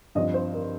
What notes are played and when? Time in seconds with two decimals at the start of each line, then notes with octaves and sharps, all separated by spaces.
0.15 G2 F3 C4 D#5
0.34 C5
0.53 A#4